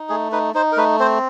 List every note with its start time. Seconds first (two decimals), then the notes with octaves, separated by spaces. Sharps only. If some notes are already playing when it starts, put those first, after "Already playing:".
Already playing: D#4
0.09 A3 G#4
0.32 D#4 B4
0.54 D#4 C5
0.72 A#4
0.77 A3 B4
1.00 C4 C5